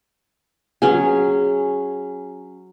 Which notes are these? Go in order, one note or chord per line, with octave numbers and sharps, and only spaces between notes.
F#3 C#4 G#4